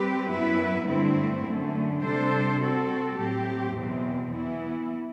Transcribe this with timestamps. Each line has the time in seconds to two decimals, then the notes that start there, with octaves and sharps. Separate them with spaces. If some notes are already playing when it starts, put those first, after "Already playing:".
Already playing: G3 C4 G4 B4
0.29 F#2 F#3 B3 E4 B4
0.87 G2 D3 A3 C4 E4
1.45 F#2 D3 A3
2.02 C3 G3 D4 A4 C5
2.60 G3 C4 F#4 A4
3.17 A2 F#3 C4 G4
3.76 E2 B2 F#3 C4
4.33 E3 B3 E4